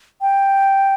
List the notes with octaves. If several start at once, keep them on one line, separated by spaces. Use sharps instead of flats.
G5